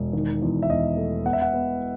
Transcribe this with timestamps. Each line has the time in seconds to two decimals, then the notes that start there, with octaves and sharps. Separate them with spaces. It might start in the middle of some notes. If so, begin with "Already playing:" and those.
Already playing: E1
0.13 D#3
0.42 E2
0.63 E5
0.69 E2 D#5
0.97 A3
1.26 B3 F#5
1.33 E5
1.42 F#5
1.54 B3